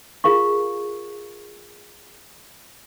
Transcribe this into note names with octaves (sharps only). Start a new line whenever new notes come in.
F4 G#4 A#4 F5 C#6